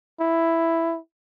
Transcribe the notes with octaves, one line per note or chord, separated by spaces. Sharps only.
E4